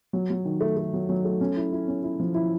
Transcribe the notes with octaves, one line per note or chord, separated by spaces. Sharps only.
F#3
F#3
D#3
A3
A3
F#3
F#3
A3
C#4
E4
E4
C#4
E4
F3
E4